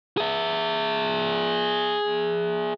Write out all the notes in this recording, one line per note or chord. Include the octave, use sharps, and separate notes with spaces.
G#4 E5